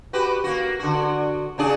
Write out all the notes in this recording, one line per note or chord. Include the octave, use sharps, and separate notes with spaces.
F#4 G4 B4
A#3 F#4
D3 F#4
C#3 D4 G#4